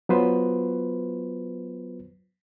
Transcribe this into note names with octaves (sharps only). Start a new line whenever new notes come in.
F#3 B3 F4 B4 C5